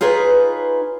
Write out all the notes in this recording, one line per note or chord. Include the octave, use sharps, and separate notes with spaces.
D#4 F4 G#4 B4 C#5